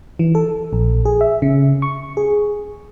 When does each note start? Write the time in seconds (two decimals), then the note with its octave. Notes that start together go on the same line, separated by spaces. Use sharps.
0.19 E3
0.35 A4
0.73 A#1
1.05 G#4
1.21 E5
1.42 C#3
1.82 C#6
2.17 G#4